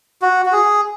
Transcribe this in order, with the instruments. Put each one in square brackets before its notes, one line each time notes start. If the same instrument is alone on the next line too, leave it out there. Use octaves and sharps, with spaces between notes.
[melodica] F#4
F#4
G#4